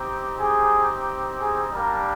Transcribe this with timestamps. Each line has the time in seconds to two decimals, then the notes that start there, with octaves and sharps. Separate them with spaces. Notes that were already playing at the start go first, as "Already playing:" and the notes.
Already playing: C4 D#4 G4
0.38 G#4
1.39 G#4
1.73 G3 A#3 D4 G4 A#4